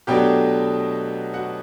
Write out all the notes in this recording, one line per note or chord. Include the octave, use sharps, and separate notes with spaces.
B2 F#3 A3 D4 G4 G5
F#4 F#5